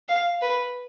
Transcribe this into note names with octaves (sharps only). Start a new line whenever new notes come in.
F5
B4